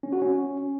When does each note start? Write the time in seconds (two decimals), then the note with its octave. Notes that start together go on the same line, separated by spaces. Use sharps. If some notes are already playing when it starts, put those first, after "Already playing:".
0.03 C#4
0.12 F#4
0.22 C#4